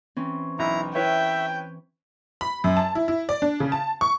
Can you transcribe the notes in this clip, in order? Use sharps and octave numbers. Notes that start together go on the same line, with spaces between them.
E3 C4 C#4
B1 E4 A#5
E4 B4 C#5 E5 G5
B5
F#2
A5
E4
E4
D5
D4
C#3
A5
C#6